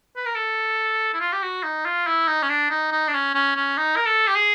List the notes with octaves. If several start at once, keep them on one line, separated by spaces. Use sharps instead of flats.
B4
A#4
A4
E4
F4
G4
F#4
D#4
F4
E4
D#4
C#4
D4
D#4
D#4
D4
C#4
C#4
C#4
D#4
A#4
A4
G4
G#4